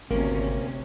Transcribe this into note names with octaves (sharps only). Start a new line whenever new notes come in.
G#1 D2 C3 A#3 C#4